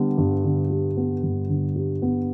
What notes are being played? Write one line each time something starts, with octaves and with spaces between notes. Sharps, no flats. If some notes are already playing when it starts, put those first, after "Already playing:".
Already playing: D3 G3 B3
G2
D3
G3
B3
G2
D3
G3
B3